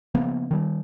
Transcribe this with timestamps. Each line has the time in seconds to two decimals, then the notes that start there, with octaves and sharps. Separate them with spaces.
0.14 C#3 F3 A#3 B3
0.51 D#3 G3